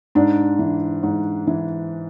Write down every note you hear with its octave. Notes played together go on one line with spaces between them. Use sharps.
G#2 D4
E3
G#2
E3